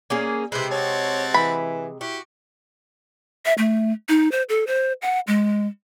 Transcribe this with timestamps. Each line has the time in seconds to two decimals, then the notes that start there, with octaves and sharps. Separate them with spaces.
0.10 A#3 C#4 G#4
0.52 C3 G#3 E4 B4 C5
0.71 C4 F#4 C#5 A5
1.34 E3 B5
2.01 E4 F#4 G4
3.45 E5
3.58 A3
4.09 D#4
4.32 C5
4.49 A4
4.67 C5
5.02 F#5
5.28 G#3